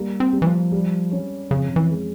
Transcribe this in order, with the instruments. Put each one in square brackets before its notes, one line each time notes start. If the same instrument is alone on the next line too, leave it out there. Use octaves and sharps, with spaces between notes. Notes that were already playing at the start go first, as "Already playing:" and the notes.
Already playing: [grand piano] G3 A#3
[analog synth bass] C4
[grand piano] G3
[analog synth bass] E3
F3
[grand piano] G3
C#4
[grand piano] F2 [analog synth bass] C#3
[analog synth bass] E3
[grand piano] G#3